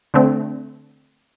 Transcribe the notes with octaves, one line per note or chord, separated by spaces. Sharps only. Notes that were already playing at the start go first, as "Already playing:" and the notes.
D3 A3 C4